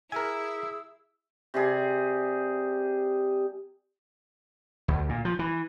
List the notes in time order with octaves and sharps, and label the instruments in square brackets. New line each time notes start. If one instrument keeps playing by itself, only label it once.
[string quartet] E4 [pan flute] G#4 [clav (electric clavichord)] A#4 G#5 [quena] E6
[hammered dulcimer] C3 G3 G#4
[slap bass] D2
A#2
F3
E3